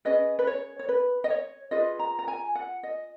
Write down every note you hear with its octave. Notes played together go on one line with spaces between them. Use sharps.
C#4 G#4 B4 D#5
B4
C#5
C#5
B4
D#5
C#5
F4 G#4 B4 D#5
A#5
A#5
G#5
F#5
D#5